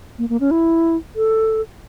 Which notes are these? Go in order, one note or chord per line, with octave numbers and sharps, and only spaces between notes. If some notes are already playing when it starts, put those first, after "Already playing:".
A#3
A#3
C#4
E4
A4